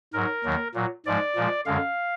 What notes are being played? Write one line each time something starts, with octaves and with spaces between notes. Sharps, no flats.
G#2 F#3 A#4
D#2 D#3 F#3
A#2 F#3
G#2 F3 G#3 D5
A#2 F3 G#3
F#2 D3 G#3 F5